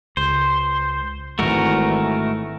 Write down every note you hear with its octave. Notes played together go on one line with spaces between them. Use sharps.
C#2 C5
G#1 G#2 D#3 E3 G#3 A3 F#4 A#4